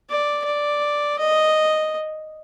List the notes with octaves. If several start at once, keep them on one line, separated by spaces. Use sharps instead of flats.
D5
D5
D#5